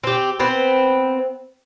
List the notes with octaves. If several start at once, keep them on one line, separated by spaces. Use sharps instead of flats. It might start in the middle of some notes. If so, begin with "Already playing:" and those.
C4 G4
B3 C4 C5